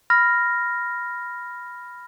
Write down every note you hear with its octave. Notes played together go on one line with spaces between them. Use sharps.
B5 F6 A#6